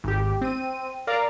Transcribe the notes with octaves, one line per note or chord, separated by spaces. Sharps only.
G#1 G4
C4 D#7
A#4 D5 F5 A#5